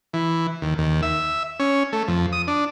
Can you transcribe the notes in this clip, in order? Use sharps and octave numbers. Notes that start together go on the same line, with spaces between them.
E3
D#2
D#2
E5
C#4
A3
F2
D#6
D4